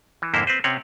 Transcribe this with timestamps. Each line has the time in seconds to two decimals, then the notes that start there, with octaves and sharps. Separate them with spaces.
0.22 E3
0.34 F2 G#2 D3 A#3 E4 C5
0.47 C4 B4 C5
0.64 C3 C4 C#4 C#5 F#5